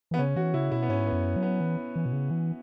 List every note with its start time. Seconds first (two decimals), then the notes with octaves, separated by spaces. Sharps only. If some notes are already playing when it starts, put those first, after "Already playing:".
0.11 E3
0.14 B3
0.19 C#3 C#4
0.36 E3 F#4
0.54 C#3 E4
0.72 B2 E4
0.82 B3
0.89 G#2 C#4
1.07 B3
1.12 F#2
1.36 F#3
1.43 B3
1.60 E3
1.96 E3
2.06 B2
2.13 C#3
2.31 E3